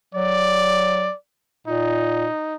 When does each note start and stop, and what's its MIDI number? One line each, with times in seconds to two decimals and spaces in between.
0.14 1.08 54
0.14 1.16 74
1.67 2.26 46
1.67 2.56 63